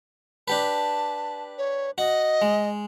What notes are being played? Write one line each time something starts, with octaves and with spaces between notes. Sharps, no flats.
D4 G4 B4 A5
C#5
F#4 D#5
G#3